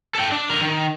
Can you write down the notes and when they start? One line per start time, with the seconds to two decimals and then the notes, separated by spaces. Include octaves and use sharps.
0.15 A4 G5
0.32 D4
0.50 D3 A#4
0.61 D#3